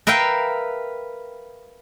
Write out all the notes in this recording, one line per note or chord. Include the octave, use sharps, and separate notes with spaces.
A#4 B4 E5 F5 G5